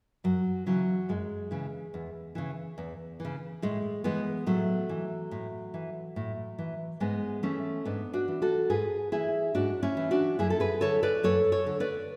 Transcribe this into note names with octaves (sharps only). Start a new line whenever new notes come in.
F#2 F#3
C#3 E3 F#3
F#2 G#3
C#3 E3
E2
C#3 E3
E2
C#3 E3
A2 G#3
E3 G#3 B3
A2 F#3 A3
E3
A2
E3
A2
E3
G#2 G#3 B3
E3 A3 C#4
G#2 B3 D4
D4 F#4
E3
F#4 A4
G#2 G#4 B4
E3 E4 G#4
G#2 D4 F#4
C#4 E4
E3
D4 F#4
F#2 E4 G#4
A4
G#4 B4
D3 A4 C#5
B4 D5
F#2 A4 C#5
A4 C#5
D3
B4 D5